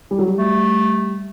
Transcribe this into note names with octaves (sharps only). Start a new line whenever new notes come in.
G3
F#3
G3
A3